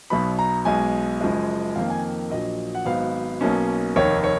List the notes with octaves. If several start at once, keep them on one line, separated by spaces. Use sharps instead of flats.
B1 B2 F#3 B3 B5
A#5
B1 B2 G#3 G#5
F#1 F#2 F3 G#3
F2 D#3 A#3 F5
G#5
A#1 A#2 F#3 D#5
F#5
G#1 G#2 F#3 B3 F5
B1 B2 A#3 C#4
F1 D#2 D#3 C#5
C#5